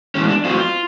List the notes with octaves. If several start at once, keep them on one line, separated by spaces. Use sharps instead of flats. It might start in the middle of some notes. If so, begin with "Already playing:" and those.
A2 E3 G#3 C#4
D4
A2 F#3 A3 C4 F4